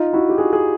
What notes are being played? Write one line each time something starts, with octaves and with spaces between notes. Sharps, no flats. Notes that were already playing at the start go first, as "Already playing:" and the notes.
Already playing: D#4 F4
E4 F#4
G4
F#4 G#4
G#4